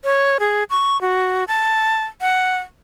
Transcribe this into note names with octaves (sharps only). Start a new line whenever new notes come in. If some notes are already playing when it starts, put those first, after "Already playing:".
C#5
G#4
C#6
F#4
A5
F#5